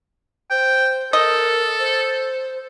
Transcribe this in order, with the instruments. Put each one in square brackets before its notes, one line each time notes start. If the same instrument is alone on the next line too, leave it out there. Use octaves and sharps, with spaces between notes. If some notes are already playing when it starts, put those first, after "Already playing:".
[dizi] C5 [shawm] G5
[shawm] A4 [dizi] A#4 [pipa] D#5
[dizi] C5